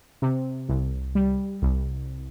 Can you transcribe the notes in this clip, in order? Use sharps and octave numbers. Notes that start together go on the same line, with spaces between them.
C3
C2
G3
C2